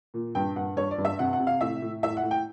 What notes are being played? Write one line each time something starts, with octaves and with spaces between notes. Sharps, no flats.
A#2
G2 G5
G2 F#5
G2 C#5
D5
G2
E5
C3 F#5
F#5
C3
F5
A2 E5
A2
A2 E5
F#5
A2
G5